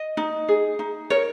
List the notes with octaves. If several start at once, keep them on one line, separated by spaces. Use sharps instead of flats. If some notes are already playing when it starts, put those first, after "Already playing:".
Already playing: D#5
D#4
G#4
D#4
A#4 C#5